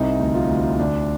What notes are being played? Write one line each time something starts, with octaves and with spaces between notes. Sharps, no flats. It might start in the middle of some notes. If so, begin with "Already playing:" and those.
Already playing: C2 C3 D#4
D2
F4
D2
D2 D4